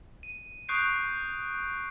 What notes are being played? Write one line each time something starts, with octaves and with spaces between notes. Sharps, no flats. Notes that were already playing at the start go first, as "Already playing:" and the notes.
D#7
C#6 D#6 F#6 G6 C7 D7